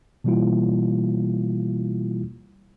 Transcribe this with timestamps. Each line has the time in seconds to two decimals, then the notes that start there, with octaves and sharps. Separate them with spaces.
0.24 B2 E3 G3 A#3 E4 F4